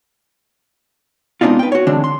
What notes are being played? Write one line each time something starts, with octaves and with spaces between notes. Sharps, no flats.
G#3 B3 C4 D4 D#4 F4
B4 G5
F#4 C#5
D3 E3 G#3 C4 D4
C6